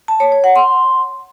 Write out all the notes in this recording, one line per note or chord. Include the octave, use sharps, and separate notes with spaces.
A5
C#5
C#5
F#5
C6